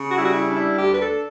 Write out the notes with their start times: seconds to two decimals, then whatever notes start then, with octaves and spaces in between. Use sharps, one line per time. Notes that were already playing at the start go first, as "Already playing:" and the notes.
Already playing: C#3
0.11 F#4
0.18 G3 E4
0.25 F#4
0.34 E4
0.49 D4
0.56 E4
0.79 D2 G4
0.94 B4
1.02 A4